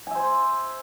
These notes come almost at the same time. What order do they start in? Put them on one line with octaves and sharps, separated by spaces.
G#5 E5 C5